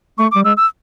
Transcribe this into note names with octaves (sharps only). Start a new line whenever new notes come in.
A3 C#6
G3 D6
G#3 E6
E6